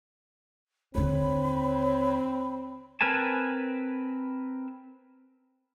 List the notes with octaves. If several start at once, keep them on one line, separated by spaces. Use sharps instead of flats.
D#2 D3 C4 C#5 B5
C4 A#4 B4 G#5 A5